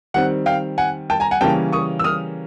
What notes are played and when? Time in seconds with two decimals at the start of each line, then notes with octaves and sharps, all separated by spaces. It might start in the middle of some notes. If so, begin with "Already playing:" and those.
0.14 D#3 G3 C4 F#5
0.46 F5 G5
0.78 F#5 G#5
1.10 G5 A5
1.20 G#5 A#5
1.31 F#5 G#5
1.41 C#3 E3 G3 A#3 C#4 G5 A5
1.72 C#6 D#6
1.99 E6
2.04 D#6 F6